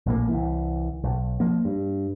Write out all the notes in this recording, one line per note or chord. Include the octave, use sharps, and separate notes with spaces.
A#1 A2 A#3
C2 E3
B1
F3 A#3
G2